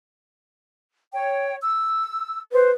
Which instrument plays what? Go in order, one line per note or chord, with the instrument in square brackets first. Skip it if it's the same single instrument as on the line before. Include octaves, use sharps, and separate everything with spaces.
[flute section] C#5 G5
E6
[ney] B4 [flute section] C5